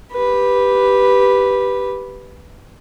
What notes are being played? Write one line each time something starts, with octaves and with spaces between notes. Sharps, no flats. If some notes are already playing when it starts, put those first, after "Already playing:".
G4 B4